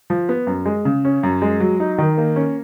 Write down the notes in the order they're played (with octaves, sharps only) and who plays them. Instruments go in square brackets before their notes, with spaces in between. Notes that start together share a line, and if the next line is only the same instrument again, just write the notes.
[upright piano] F3
B3
F#2
G#3
C#3
C#4
F#2
G#3
F#3
D#4
D#3
A#3
C#4